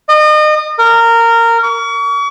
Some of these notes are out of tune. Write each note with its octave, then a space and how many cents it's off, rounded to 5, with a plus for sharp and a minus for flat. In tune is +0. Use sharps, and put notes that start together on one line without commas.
D#5 -35
A#4 -15
C#6 +40